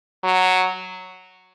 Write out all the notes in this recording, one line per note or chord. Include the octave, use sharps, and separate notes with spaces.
F#3